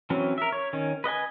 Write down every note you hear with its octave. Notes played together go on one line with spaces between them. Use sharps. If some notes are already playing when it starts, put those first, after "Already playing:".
E3 F#3 C4 C#4
A#4 E5
C#5
D#3 C#4
B4 D#5 F#5 G#5